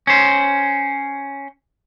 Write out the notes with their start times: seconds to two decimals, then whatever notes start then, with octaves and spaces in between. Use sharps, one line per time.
0.07 C#4 C5